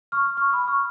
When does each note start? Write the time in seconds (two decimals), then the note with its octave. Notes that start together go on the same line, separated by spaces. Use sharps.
0.12 C#6 F6
0.37 C#6 F6
0.53 B5 D#6
0.68 C#6 F6